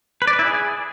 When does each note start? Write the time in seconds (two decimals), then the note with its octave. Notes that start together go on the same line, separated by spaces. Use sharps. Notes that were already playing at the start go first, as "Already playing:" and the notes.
0.22 B4
0.27 D5
0.33 B4
0.39 E4
0.45 G#4